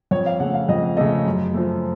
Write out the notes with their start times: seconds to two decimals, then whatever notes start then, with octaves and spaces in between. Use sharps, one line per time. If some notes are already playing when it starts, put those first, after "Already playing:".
0.11 F2 C#5
0.26 F5
0.40 C#3 A3 F#5
0.54 F5
0.69 F2 D#5
0.97 C#3 A3 D#5
1.26 F#2
1.54 F3 A3